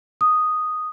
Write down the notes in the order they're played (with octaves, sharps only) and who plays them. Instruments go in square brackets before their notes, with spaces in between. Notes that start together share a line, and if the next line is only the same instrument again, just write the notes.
[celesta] D#6